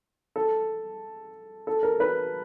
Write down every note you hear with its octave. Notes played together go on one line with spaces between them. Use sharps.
A4
A4
A#4
B4